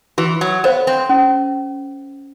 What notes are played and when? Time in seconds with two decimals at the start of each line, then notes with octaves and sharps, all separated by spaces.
0.18 E3 F#4
0.41 F#3
0.64 B3 A4 C5 F5
0.87 C4
1.09 C#4